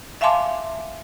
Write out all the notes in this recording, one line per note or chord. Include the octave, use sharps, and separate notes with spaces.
E5 F5 G#5 A5 C6 D6